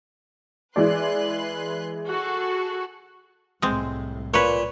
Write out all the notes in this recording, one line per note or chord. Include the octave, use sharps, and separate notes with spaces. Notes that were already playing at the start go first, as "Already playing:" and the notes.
E3 G#3 B4 D5 C6 F#6
F#4 G#4 A4
C2 A2 G#3 C4
A#2 B4 C#5